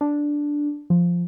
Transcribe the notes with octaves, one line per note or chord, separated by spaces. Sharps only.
D4
F3